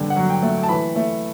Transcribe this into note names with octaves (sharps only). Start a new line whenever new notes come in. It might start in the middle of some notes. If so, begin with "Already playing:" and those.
Already playing: G2 D3
F#5
F#3
G5
A3
A5
E3 B5
A3